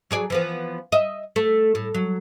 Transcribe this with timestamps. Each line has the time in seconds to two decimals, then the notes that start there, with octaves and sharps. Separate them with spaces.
0.11 F#3 G#4 D5
0.30 E3 F3 B3
0.92 D#5 E5
1.36 A3
1.75 A2
1.95 F#3